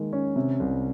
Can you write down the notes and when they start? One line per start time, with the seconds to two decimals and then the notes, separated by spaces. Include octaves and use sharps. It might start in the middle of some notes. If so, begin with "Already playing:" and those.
Already playing: D#3 G#3 A#3
0.13 C#4
0.36 C3
0.60 C2